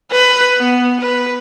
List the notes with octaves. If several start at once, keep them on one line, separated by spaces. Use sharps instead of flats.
B4
B3
B4